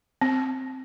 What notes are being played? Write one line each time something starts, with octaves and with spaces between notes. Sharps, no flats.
C4